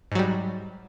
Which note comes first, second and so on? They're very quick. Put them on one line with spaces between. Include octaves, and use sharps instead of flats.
G#2 F#3 G3